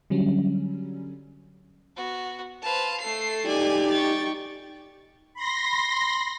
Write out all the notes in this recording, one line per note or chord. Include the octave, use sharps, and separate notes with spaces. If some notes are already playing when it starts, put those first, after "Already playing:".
D3 F#3 G3 C#4
B3 F#4
B4 C5 F5 A5
A3 A4 C7
D#4 G4 D5 G#5
G5 C#6 A6
B5 C6 A#6